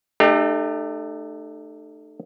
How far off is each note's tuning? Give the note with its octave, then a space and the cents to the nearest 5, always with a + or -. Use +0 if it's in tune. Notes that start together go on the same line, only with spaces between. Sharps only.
A3 +0 D#4 -40 G4 +25